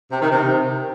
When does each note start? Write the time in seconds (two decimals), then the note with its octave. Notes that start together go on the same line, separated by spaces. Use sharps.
0.11 C3
0.21 D#3
0.31 C3